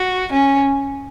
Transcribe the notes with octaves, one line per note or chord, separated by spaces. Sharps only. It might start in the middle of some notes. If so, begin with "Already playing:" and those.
Already playing: F#4
C#4